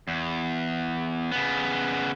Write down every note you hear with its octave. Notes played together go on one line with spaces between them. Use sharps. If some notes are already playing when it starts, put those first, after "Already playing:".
E2
C#3 B3